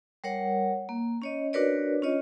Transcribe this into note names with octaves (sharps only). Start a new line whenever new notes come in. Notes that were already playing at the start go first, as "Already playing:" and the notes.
G3 A#4 C#5 F#5
A#3
C#4 C#5 D#5
D4 F#4 A#4 B4 C#5 D5
C#4 F4 C#5 D#5